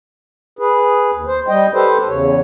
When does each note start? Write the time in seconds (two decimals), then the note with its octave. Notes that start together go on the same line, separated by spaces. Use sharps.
0.59 G#4 B4
1.13 D#2
1.27 C5
1.48 G3 D#5 G5
1.74 G4 A4 B4 C5
2.08 E2 C#3 C#5